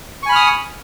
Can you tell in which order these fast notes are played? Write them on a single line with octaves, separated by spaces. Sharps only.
C#6 G#5 B5 F6 D#6